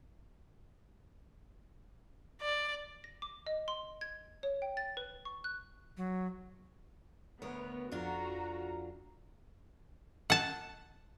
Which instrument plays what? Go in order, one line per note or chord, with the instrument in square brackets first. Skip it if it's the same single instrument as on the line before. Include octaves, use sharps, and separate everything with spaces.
[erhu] D5
[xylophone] A#6
D6
D#5
C6
G#6
C#5
G5
A6
B4
C#6
F#6
[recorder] F#3
[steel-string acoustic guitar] D2 A#4 C#5 [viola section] B3
[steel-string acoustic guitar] F2 D4 F4 [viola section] F#4 A#5
[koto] F#5 A5